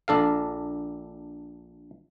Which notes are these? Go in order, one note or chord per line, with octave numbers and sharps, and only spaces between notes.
A#1 D4 A4 F5